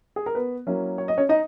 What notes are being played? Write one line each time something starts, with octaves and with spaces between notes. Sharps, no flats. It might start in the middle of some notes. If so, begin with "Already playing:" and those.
G#4
A#4
B3 B4
F#3 A#3 C#4 E4
C#5
D#5
C#4 C#5
D#4 D#5